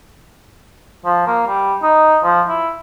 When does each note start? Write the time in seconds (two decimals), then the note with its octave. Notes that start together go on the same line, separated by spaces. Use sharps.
1.05 F3
1.27 A#3
1.47 G3
1.83 D#4
2.24 F3
2.48 E4